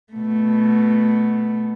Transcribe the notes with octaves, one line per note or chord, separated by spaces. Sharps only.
B2 A3